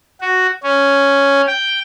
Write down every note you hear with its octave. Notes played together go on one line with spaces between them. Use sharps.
F#4
C#4
G5